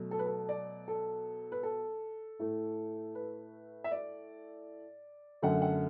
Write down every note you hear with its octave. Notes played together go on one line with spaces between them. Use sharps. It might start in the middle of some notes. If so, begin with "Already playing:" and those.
Already playing: B2 F#3 A3
A4
B4
A4
D5
A4
B4
A4
A2 A3
B4
E5
D5
F#2 D3 A3 F#5
F#5